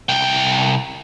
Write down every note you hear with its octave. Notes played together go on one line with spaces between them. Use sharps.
C2 G5